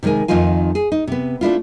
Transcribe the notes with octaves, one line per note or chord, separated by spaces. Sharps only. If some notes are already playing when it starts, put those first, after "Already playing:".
C3 D#3 G#3 A#4 G#5
F2 D#3 A3 D#4 F4 G#5
G#4
D#4
C3 B3
A3 D4 E4 F4